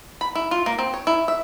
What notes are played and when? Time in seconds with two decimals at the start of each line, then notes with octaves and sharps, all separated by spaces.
0.21 B5
0.35 E4
0.51 F4
0.66 A#3
0.79 C4
0.94 C#5
1.07 E4
1.28 E5